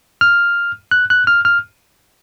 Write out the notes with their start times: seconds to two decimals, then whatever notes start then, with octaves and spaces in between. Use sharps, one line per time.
0.21 F6
0.91 F#6
1.10 F#6
1.27 F6
1.45 F6